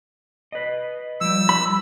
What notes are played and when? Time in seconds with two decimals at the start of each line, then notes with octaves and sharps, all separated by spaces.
0.52 B4 D#5
1.21 F3 G3 E6
1.49 B5